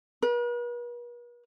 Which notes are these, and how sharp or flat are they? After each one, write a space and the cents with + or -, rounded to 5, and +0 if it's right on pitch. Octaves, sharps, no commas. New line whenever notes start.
B4 -45